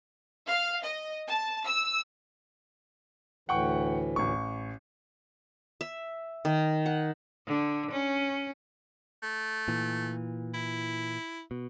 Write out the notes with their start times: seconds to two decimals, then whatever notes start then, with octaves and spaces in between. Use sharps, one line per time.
0.45 F5
0.82 D#5
1.28 A5
1.67 E6
3.49 D2 A2 E3 F#5 G5 C#6
4.16 A1 C#6
5.81 E5
6.45 D#3
6.86 F#5
7.47 D3
7.91 C#4
9.23 A3
9.68 A#2 E3
10.54 E4
11.51 B2